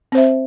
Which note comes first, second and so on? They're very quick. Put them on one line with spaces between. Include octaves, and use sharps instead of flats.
C4 C5 E5